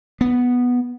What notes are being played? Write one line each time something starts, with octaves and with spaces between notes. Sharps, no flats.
B3